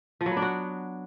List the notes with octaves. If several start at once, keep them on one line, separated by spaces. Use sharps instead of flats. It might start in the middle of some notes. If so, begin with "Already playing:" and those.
F3
F#3
B3
D4
F#4